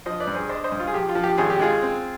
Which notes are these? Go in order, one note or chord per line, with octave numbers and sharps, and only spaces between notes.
F3 C5 D#5
B4 D5
G2
G#4 C5
D4 C5 D#5
C5 D#5
G2
F4
G#4
F3 G4
F4
F3
G4
G#1 G#4
G4
G#3 F4 G#4
C4